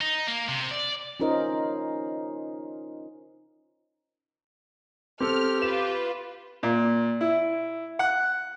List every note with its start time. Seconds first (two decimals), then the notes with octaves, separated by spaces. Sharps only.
0.01 D#4
0.28 A#3
0.48 C3
0.71 D5
1.20 C#4 D#4 F4 A#4 C5 D#5
5.20 C4 G4 A4 F6
5.62 F4 B4 E7
6.63 A#2
7.21 E4
7.99 F#5